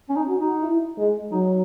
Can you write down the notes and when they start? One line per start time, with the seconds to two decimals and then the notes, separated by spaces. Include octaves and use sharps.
0.09 C#4
0.16 D#4
0.28 F#4
0.40 D#4
0.63 E4
0.98 G#3
1.32 F#3 D#4